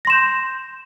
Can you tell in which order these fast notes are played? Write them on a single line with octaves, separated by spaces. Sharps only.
A#6 C6 E7 G6